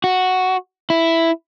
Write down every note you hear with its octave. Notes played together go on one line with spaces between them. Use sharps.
F#4
E4